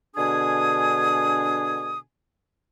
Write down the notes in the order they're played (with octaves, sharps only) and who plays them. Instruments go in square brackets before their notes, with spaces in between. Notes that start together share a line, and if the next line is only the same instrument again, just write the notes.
[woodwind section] B2 D3 D4 G#4 G#5 D#6